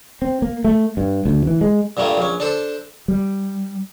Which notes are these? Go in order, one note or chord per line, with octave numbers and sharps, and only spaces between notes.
C4
A#3
A3
G2
D2
E3
G#3
G2 A#2 G3 A3 A#3
A#1 C#4
D4 A4 C5
G3